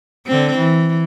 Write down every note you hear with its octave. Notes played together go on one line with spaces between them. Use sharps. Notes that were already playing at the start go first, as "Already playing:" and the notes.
D3 C4
E3